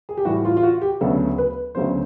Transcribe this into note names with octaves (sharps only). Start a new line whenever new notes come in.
G#4
G4
A2 E3 G3 F#4
F4
F4
F#4
G4
D2 C#3 F#3 B3 A4
B4
D2 C#3 F#3 B3 C5